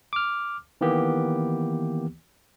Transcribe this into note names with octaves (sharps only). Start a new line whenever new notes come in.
D6 F6
D#3 E3 A#3 B3 G4